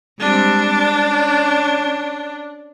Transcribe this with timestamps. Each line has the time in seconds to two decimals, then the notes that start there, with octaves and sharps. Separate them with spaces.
0.21 G3 G#3 C4 D4
1.02 C#4